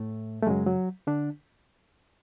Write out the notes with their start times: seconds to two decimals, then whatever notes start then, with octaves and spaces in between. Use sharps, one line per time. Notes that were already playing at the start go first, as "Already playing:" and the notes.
Already playing: A2 A3
0.42 A3
0.47 F#2 C#3 F#3 G#3
0.67 F#3
1.07 D3 D4